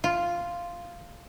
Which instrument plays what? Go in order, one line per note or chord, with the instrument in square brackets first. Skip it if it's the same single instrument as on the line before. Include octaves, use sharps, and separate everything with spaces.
[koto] F4